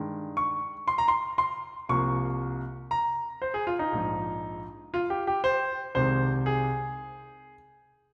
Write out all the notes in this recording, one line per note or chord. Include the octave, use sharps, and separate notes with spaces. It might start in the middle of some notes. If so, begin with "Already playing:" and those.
Already playing: G2 D#3 G#3
C#6
C6
A#5
C6
C6
C2 C3 F3 A#3 C#6
A#5
C5
G#4
F4
D#4
A#1 G#2 F3
F4
G4
G4
C5
C2 C3 D#3 G#3 C5
G#4